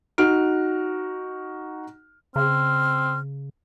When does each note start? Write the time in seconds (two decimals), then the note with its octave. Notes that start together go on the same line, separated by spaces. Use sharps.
0.18 D#4 F#4 F6 D7
2.36 C#3 C4 F6